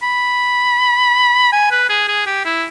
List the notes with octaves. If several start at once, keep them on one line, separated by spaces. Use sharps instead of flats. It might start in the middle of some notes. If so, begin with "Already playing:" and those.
B5
G#5
B4
G#4
G#4
G4
E4